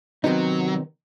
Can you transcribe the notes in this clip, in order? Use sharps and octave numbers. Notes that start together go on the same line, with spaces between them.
C3 D#3 F#3 G3 B3 D#4